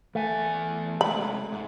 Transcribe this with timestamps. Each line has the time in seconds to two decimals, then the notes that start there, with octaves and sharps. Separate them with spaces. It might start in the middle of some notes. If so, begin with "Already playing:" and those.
0.15 E2 A3 G#5
1.01 C3 G#3 B5
1.52 G#2